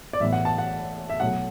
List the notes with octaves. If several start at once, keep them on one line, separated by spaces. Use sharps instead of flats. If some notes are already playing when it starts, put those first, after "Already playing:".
D5
A1 A2 E3 B3 E5
F#5
A5
F#5
E5
B1 B2 F#3 A3 F#5